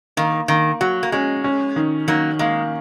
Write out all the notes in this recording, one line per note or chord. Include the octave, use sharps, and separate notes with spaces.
D#3 A#3
D#3 A#3
F#3 F#4
A#3
G#3 C#4
C#4
D#3
D#3 F#3 A#3
G#3 A#3